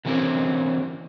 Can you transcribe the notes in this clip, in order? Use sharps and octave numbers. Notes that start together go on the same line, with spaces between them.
D3 E3 A#3 C4 C#4